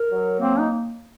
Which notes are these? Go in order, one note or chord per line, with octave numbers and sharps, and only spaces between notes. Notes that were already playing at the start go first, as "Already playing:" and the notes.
Already playing: A#4
F#3
A#3 C4
D#4